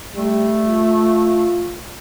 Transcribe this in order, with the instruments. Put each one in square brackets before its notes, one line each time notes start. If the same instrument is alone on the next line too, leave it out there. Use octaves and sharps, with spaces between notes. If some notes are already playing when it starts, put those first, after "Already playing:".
[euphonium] G3 [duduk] A3
[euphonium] F4